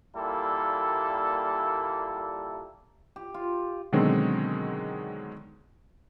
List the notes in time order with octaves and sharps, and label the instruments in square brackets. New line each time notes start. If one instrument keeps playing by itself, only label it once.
[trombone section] A#2 G3 A#3 E4 A4
[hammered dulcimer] G4
F4
[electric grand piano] B2 D3 D#3 F#3 G#3 C4